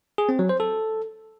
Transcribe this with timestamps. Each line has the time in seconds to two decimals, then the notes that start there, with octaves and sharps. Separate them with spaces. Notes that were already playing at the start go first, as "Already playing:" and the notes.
0.18 G#4
0.29 C4
0.39 F#3
0.49 C5
0.60 A4